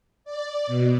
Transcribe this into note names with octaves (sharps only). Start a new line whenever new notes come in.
D5
B2